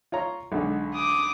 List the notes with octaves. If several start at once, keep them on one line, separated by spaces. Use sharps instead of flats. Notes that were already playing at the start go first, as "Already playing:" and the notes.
F4 C#5 A#5
B1 D3 G#3
D6 D#6